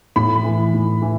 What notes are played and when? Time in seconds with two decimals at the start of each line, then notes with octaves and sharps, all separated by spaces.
0.16 A2 B5
0.44 E3
0.74 A2
1.02 E3